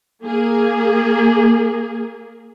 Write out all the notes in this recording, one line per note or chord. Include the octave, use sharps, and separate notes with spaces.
A#3 G#4